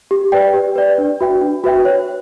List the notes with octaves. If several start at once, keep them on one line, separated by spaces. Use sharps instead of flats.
G4
B4 D5 G5
G4
B4 D5 G5
D4
F#4 B4 E5 G5
D4
F#4 B4 E5 G5
C#5